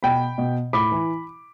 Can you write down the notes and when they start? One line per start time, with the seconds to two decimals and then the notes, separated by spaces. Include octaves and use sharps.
0.03 B2 G5 B5
0.38 B2
0.73 A2 B5 D6
0.92 E3